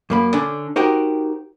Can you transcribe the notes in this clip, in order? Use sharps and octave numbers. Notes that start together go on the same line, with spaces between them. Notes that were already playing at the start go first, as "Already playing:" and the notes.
F#2 A#3 B5
D3 C#4 D4
D#4 F#4 G4 A#4 C5 G5